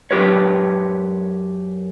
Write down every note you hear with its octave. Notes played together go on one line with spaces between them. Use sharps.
F#2 G4 B4 C#5